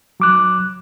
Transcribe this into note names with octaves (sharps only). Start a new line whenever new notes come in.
F#3 D6 F#6